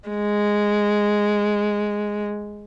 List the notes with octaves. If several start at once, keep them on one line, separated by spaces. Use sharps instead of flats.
G#3